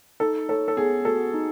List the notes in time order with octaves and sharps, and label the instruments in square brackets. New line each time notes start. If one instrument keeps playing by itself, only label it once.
[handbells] D#4 [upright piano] A4
[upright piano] A4 [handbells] C#5
[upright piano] A4
[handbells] B3 [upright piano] G#4
[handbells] F#4 [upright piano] A4
[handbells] D#4